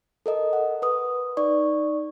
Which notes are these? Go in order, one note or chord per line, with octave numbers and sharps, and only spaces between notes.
A4 A#4 D#5
F#5
B4 D#6
D#4 D5 C#6